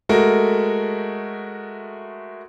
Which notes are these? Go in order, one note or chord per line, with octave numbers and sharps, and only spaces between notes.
G#3 A3 F#4 A4 A#4